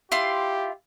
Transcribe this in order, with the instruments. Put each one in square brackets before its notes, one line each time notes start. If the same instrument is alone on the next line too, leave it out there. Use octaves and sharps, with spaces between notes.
[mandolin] E4 F4 C6 [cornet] G4